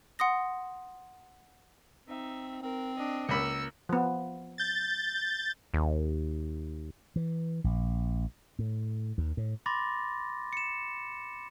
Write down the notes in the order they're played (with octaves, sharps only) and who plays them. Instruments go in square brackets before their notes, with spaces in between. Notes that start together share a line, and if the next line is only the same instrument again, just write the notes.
[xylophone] F#5 C6 D#6 A#6
[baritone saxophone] C4 [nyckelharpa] D#4 E5
[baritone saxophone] C4 [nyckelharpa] A#4
[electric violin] D4 [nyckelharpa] D#5
[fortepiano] C#2 B5 [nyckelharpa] A#3 A#4 [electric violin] E6 C#7
[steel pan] F3 B3
[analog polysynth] G6 A6
[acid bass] D#2
[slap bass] E3
A#1
A2
D#2
A2
[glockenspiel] B5 C6 D6 A6 A#6
C#7 E7